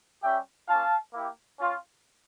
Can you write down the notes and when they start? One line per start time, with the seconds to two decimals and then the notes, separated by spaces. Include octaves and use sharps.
0.23 G3 C#4 G4 E5 G5
0.68 A#3 C#4 F4 F5 A5
1.13 A#3 E4 G4
1.59 C#4 F4